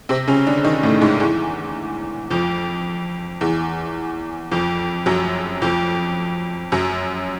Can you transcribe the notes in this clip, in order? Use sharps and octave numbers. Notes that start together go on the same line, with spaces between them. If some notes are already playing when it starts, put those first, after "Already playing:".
C3 C4
C#3 C#4
D3 D4
D#3 D#4
A2 A3
G#2 G#3
E2 E3
F2 F3
E2 E3
F2 F3
F#2 F#3
F2 F3
F#2 F#3